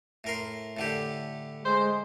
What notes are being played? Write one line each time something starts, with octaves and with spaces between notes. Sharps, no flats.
A2 A#4 C6
A2 D3 G4
G#3 C5